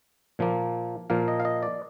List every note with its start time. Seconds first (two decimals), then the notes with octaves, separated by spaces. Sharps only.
0.39 A#2 F3 A#3
1.10 A#2 F3 A#3 F5
1.28 D#5
1.40 F5
1.45 D#5
1.63 D5